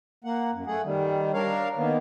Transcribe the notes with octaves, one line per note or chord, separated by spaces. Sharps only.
A#3 F#5
F#2
A3 G#4 F#5
D#3 G3
D4 A#4 C#5 F5
D#3 A#3 B3